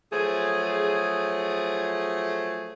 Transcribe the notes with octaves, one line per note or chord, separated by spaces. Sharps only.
F3 F#3 A3 G#4